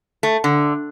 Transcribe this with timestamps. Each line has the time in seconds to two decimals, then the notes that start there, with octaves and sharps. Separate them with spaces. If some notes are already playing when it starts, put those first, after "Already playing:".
0.23 A3
0.44 D3